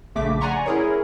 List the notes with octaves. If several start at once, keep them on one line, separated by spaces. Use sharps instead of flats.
A#1 C#3 A3 D6 B6
D5 F#5 G#5 A#5 C6 C#6
C#4 E4 G#4 A#4 C#5